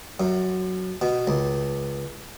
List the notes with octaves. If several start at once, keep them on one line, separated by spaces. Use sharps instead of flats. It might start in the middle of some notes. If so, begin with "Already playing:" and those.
F#2
B2
C#2